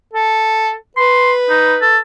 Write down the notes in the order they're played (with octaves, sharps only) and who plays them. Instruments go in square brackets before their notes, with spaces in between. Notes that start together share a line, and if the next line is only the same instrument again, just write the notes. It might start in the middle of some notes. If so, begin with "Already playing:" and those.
[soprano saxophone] A4
[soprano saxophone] B4 [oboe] C6
[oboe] D#4
A4